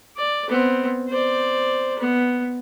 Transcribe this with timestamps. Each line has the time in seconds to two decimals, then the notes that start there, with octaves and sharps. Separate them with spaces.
0.17 D5
0.49 B3 C4
1.09 C5 D5
1.99 B3